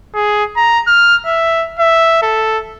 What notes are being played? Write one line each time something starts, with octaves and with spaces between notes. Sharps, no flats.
G#4
A#5
F6
E5
E5
A4